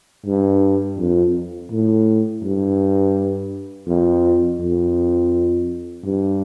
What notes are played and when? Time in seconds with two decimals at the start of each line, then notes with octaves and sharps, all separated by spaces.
0.26 G2
0.98 F2
1.71 A2
2.43 G2
3.87 F2
4.61 F2
6.05 G2